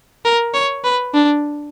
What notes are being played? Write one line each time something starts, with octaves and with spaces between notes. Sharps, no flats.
A#4
C#5
B4
D4